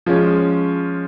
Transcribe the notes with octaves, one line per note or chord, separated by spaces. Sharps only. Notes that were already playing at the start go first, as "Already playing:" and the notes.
F3 G#3 C#4